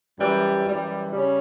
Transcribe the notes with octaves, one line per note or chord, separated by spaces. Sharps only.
F#2 E3 G3
F#2 E3 G3
C#3 G3 C#4